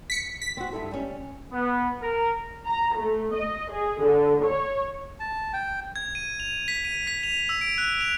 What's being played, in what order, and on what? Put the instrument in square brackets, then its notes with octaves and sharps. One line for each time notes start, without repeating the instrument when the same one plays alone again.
[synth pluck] B6 C#7
B6
[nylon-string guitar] C4 F#4
G2 E4 A4
G3 C#4
[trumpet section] B3
A#4
[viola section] A#5
A3
D#5
G#4
D3
C#5
[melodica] A5
G5
[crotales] G#6
D#7
F7
B6
D#7
B6
F7
E6
D7
F#6
F7